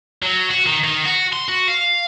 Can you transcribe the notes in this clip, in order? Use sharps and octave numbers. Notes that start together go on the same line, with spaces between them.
F#3
F#4
D#3
D#3
F#4
C6
F#4
F5